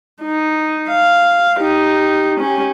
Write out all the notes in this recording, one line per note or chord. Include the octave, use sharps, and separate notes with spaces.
D#4
F5
D#4 G4
C#4 G4